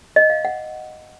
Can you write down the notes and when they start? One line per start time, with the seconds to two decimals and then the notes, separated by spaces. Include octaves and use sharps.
0.16 D#5
0.30 F5
0.45 F#5